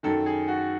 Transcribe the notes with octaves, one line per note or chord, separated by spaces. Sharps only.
F#2 D#3 A4
G#4
F#4